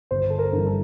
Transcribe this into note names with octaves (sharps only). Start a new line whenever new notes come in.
G1 C5
A4
A#4
G2 E3
A4